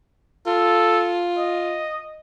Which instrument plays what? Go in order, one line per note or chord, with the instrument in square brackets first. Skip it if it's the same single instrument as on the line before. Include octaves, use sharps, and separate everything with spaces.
[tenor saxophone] F4 [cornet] A4
[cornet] D#5